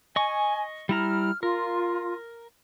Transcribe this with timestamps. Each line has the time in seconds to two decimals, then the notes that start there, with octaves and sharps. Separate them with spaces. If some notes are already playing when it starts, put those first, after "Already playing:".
0.16 D#5 G#5 C#6
0.89 G3 E4 A#5 F6
1.43 F4 A#4